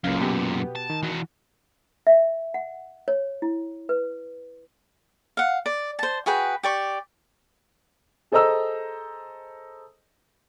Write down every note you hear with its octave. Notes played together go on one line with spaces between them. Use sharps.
C#2 F#2 A#2 C#3 F5
B2 B3 G4
A5
D#3
E3 F#4
E5
F#5
C#5
E4
B4
F5 F#5
D5
C5 A5
F#4 G#4 B4 G5
G4 D5 C#6
G#4 A4 C5 D#5 A#5 E6